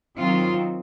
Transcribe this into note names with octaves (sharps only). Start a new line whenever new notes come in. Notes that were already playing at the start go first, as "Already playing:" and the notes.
D#3 F#3 C4 F4